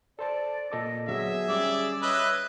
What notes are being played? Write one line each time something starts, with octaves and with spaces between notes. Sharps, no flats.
A4 C5 D5 A5
A#2 A4 D#5 D6
D3 F#3 B3 G#4 E5
G3 C#4 D5
B4 C#5 D#5 E5